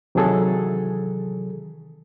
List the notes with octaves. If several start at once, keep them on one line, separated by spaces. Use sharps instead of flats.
C3 D#3 E3 F#3 G#4 A4